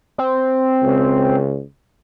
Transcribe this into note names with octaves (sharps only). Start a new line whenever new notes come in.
C4
C#2